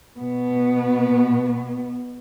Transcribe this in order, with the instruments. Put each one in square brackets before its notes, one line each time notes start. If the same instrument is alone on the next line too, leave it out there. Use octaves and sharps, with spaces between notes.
[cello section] B2 B3